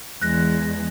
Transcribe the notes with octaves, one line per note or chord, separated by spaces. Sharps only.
E2 G#3 F#6 A#6